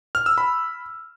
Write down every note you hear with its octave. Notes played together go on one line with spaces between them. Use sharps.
F6
E6
B5